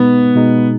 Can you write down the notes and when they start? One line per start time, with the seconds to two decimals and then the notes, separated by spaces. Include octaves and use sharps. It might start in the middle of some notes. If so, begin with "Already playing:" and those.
Already playing: B2 G#3 B3 D#4
0.35 B2 G#3 D#4